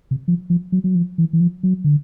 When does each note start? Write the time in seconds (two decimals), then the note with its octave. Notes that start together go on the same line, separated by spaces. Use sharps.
0.11 C3
0.28 F3
0.50 F3
0.72 F#3
0.84 F#3
0.95 F3
1.18 E3
1.33 E3
1.40 F3
1.63 F#3
1.84 D3